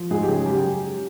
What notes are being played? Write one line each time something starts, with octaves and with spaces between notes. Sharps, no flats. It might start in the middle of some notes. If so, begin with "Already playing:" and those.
Already playing: F3
G#2 G#4
G4
C#3 G#4
F#2 G4